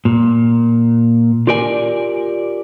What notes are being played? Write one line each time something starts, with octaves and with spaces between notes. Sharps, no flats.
A#2
F4 G4 A#4 D5 G#5